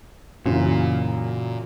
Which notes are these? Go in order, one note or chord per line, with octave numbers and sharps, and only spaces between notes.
F#2 A#2 C#3 E3